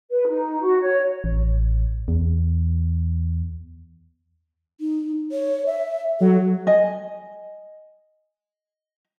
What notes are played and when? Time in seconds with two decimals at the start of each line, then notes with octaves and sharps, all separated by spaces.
0.10 B4
0.28 D#4
0.61 F#4
0.82 C#5
1.24 A1
2.08 E2
4.81 D#4
5.32 C#5
5.66 E5
6.20 F#3 A4
6.67 D#5 G#5